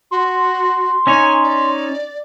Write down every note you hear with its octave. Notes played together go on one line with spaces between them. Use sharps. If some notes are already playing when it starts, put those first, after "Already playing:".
F#4 C6
C#4 D#4 C#5 G#5
D5